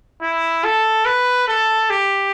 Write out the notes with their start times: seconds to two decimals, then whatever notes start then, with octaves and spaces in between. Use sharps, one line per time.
0.22 E4
0.65 A4
1.06 B4
1.48 A4
1.90 G4